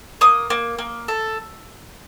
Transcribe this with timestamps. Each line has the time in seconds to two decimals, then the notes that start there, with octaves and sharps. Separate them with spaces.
0.21 A#3 D#6
0.50 A#3
0.78 A#3
1.08 A4